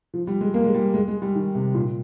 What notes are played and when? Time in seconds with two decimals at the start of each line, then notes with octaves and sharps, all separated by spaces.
0.14 F3
0.27 G3
0.41 G#3
0.54 A#3
0.64 G#3
0.74 G3
0.94 G#3
1.08 G#3
1.22 G3
1.35 D#3
1.55 C3
1.74 A#2